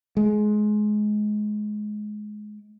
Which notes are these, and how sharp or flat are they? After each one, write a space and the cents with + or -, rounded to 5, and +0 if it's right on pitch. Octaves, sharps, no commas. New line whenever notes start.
G#3 +20